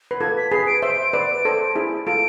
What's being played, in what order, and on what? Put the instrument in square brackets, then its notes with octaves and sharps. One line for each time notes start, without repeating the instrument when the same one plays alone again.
[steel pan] B4
[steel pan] F4 A4 [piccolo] G#6
[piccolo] B6
[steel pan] G#4 B4 [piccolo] C7
[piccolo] D7
[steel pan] C5 E5 [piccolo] D7
[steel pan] B4 D5
A4 C5
E4 G#4
[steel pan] F4 A4 [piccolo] D7